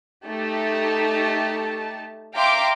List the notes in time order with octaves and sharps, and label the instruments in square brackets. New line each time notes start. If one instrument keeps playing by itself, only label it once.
[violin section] A3 D#4 G4 A5
E5 F5 G5 A#5 C6 D6